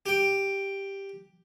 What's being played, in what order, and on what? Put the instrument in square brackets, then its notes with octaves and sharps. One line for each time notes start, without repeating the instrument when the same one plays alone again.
[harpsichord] G4 G5